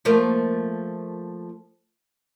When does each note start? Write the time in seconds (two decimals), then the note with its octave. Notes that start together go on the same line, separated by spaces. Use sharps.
0.05 F3 A3 A#3